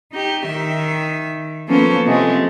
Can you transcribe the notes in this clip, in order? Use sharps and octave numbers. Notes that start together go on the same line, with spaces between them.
D#4 G4
D#3 E5
F3 A#3 B3 C#4 A4 C5
C3 F3 G#3 A3